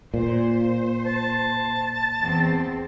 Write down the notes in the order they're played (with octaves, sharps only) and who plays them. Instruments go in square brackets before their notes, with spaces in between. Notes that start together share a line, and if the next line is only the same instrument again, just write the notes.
[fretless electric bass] A#2 [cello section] C5
[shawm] A5
[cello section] E2 C4